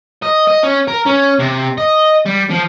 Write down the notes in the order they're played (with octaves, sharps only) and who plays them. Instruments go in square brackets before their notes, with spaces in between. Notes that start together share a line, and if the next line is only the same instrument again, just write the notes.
[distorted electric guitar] D#5
D#5
C#4
A#4
C#4
C3
D#5
G3
F3